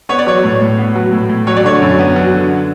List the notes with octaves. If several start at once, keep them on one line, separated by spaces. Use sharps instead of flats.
B3 C#5
D5
F#3 C#5
A2
A2
B3
F#3
A2
A2
F#3 C#5
D5
D3 C#5
F#2
B3
F#3
D3